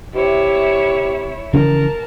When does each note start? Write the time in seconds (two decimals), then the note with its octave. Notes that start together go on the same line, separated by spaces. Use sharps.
0.14 C3 E4 C#5
1.53 C#3 E3 F3 A#4 A5